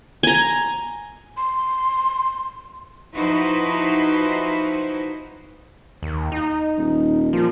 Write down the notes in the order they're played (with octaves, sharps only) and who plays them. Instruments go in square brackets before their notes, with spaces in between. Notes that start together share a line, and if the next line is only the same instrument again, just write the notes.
[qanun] G#5 A#5
[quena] C6
[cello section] F3 D#4 E4 F#4 B4 C5
[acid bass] D#2
D#4
[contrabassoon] D#1
[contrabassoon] A#2 [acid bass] F3